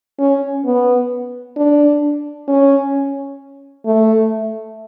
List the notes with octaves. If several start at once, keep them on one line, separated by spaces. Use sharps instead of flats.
C#4
B3
D4
C#4
A3